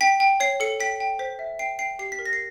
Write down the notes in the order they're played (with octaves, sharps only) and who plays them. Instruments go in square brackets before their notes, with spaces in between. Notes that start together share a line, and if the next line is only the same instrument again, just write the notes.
[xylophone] G5 B6
G5
C#5 C7
A4 C#7
G5 B6
G5
C5 B6
E5
G5 C7
G5 C7
G4 C7
B6
A#4
A#6
C7